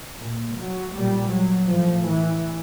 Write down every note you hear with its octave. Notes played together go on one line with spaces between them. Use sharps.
A#2
F#3
A#2 G3
F#3
A2 F3
E3